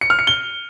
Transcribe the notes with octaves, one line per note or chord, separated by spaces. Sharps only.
C#7
F6
C#7
G7